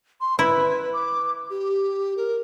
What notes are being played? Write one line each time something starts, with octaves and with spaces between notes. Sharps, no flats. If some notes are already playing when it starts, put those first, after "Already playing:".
C6
E4 B4
D6
G4
A#4